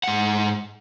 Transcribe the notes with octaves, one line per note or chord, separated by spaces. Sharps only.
G#2 F#5